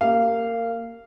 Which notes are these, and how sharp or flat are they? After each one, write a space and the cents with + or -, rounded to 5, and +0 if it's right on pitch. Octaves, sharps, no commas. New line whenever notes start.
A#3 -20 G4 +0 F5 -15